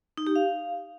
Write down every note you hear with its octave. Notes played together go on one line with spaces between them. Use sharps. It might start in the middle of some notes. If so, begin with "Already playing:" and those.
D#4
G4
F5